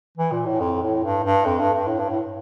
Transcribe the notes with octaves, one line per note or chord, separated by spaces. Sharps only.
E3
A#2
A2
F2
A2
G2
G2
F2
G2
G2
A2
G2
A2